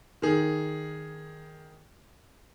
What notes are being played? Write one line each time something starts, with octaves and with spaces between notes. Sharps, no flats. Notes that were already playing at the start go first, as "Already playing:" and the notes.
D#3 G#4